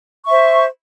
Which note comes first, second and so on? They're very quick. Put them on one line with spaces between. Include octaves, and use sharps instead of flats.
C#6 E5 C5